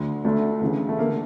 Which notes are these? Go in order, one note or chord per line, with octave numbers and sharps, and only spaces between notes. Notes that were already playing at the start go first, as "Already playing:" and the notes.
Already playing: D2 D3
D2 D3 A3
D2 C#3 E3
A3
D3 A#3